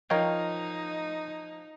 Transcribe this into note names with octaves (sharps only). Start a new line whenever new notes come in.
F3 D#4 A#4 C#5 D#5 F5 G5